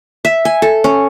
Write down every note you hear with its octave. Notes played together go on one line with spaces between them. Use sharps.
E5
G#5
A4
C#4